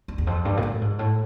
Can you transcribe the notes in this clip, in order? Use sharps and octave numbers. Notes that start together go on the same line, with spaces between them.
G2
E2
F2
G2
A#2
A2
G#2
A2